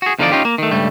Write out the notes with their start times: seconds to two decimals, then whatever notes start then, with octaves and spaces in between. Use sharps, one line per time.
0.02 F#4 G#4
0.19 E2 D3 F3 D#4 F4 D5
0.32 C#4 D#4 F4 G4
0.45 A#3
0.58 D#3 A3
0.71 C#2 G2 G3 A3